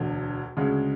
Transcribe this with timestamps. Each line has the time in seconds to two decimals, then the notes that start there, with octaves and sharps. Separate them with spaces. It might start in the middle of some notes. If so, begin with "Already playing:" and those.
Already playing: E1 D2 D3
0.57 D2 C#3 G#3